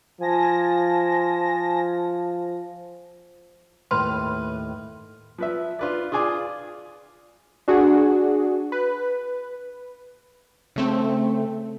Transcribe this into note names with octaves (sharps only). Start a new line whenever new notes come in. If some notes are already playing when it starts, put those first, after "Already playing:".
F3 G#5 A5 A#6
D#2 A2 B4 C6 F6
F3 B4 E5
F4 B4 D5
F4 G#4 D5 G#5 D6 D#6
D4 F#4 G#4
B4
C#3 A3 C4